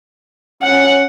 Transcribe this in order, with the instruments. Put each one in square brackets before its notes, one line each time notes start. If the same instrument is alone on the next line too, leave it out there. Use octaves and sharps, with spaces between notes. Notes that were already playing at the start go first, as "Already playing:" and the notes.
[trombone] C#4 [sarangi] F#5